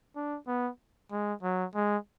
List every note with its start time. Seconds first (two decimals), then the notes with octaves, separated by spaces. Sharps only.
0.16 D4
0.47 B3
1.11 G#3
1.43 F#3
1.75 G#3